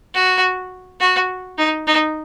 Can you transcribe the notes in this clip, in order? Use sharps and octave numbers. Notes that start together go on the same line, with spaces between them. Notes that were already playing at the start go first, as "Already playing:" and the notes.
F#4
F#4
D#4
D#4